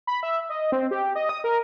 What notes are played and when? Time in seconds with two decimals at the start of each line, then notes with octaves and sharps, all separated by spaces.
0.07 B5
0.23 E5
0.50 D#5
0.72 C4
0.91 G4
1.15 D#5
1.29 D#6
1.44 A#4